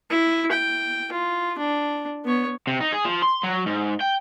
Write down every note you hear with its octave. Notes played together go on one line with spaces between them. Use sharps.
E4
G5
F4
D4
B3 C#5
C3
D#4
G#4
F3
C6
F#3
G#2
G5